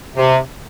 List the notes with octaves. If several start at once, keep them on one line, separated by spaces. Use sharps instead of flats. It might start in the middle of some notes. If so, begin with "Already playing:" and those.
C3